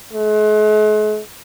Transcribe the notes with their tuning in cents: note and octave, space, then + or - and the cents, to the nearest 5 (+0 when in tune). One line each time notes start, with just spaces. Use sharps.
G#3 +45